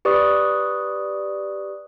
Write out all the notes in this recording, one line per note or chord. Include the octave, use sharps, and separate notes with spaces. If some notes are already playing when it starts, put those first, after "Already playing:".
G4 B4 D5 C#6 D#6